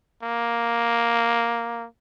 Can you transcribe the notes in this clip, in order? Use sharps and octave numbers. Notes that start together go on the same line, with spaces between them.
A#3